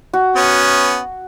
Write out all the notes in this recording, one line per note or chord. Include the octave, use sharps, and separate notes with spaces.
F#4
B3 C#4